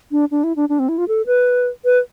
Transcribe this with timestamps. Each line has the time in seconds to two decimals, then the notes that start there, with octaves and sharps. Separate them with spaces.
0.12 D4
0.31 D4
0.44 E4
0.56 D4
0.69 D4
0.79 C4
0.89 E4
0.98 F4
1.08 A4
1.27 B4
1.85 B4